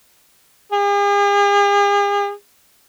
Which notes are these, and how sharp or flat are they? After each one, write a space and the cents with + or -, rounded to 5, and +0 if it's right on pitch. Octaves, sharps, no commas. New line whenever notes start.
G#4 -45